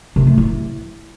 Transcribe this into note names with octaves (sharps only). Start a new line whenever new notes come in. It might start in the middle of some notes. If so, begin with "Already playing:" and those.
C3
A3
E4